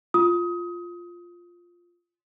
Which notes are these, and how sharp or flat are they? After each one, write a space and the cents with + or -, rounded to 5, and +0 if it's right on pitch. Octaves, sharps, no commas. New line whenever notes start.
F4 +0 D#6 +25